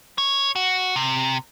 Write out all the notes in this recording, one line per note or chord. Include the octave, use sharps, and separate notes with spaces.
C#5
F#4
C3